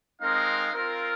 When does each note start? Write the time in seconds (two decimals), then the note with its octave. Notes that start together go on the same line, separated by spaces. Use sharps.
0.21 G#3 C4 D#4 A#4 F5
0.72 C4 F4 A#4